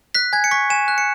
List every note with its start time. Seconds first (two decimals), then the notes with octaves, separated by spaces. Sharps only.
0.15 F#6 B6
0.33 G#5 G#6
0.44 C#7
0.51 C#6 B6
0.70 G#5 E7
0.88 F#6
0.98 C#7